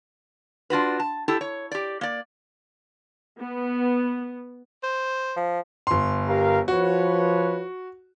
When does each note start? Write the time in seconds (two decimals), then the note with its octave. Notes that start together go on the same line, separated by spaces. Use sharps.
0.70 D4 F4 F#4 B4
1.00 A5
1.28 E4 G4 A4
1.41 C#5
1.71 G4 D5
2.01 A#3 D5
3.39 B3
4.84 C5
5.36 F3
5.87 G1 C6
6.28 G4 A#4 F5
6.68 F3 F#4 B4 C#5